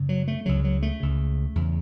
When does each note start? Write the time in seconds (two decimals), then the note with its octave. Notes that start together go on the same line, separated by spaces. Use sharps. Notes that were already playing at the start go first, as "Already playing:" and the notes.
Already playing: F#2 C#3
0.09 F#3
0.28 A3
0.46 C#2 C#3 F#3
0.64 F#3
0.82 A3
1.00 C#2 C#3
1.55 E2 C#3